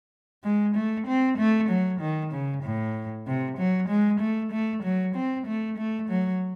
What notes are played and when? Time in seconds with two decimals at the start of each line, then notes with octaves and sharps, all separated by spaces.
0.44 G#3
0.75 A3
1.07 C4
1.38 A3
1.69 F#3
2.01 D#3
2.32 C#3
2.63 A2
3.27 C3
3.58 F#3
3.89 G#3
4.20 A3
4.52 A3
4.83 F#3
5.15 C4
5.47 A3
5.78 A3
6.09 F#3